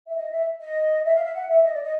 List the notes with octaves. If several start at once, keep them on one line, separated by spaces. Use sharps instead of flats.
E5
D#5
E5
D#5
E5
F5
E5
F#5
E5
D#5
D5
D#5